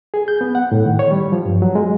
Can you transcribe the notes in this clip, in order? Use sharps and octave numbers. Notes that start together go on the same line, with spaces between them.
G#4
G6
B3
F#5
A2
D#3
C#5
G3
F3
G2
F#3
G#3